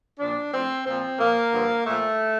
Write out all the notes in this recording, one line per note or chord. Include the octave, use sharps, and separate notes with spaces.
A#2 F3 D4
A2 F3 C4
A#2 F3 C4
A#2 F3 A#3
G2 D3 F3
A#2 F3 A3